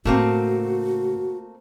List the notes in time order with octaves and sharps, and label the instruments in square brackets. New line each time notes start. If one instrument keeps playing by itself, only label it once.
[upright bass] A2 C#3 [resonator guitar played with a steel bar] A3 A#3 C4 [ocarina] F#4